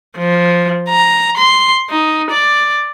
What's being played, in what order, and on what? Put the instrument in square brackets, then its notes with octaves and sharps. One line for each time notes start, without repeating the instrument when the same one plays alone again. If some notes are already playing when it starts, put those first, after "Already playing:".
[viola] F3
A#5
C6
D#4
D5